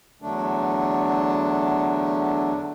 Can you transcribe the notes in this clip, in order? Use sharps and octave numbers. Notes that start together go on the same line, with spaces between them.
E2 D3 F#3 A3 D4